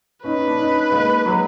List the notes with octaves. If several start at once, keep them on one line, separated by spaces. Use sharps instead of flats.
C#4 D#4 B4
C#4
D4
C#4 D#4
G#3 A#3
F#3 G#3